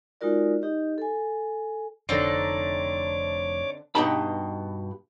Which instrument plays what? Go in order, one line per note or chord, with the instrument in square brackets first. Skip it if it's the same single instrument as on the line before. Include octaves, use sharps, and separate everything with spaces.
[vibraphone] G#3 D#4 F4 F#4 A#4 D5
D#4 G4 D#5
A4 G#5
[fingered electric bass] F1 [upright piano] D3 D5 [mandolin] C4 D4 D#4 [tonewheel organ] C#5 D6
[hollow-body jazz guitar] G2 B2 D#4 G4 A5 B5